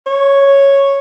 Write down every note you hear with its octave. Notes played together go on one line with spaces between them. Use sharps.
C#5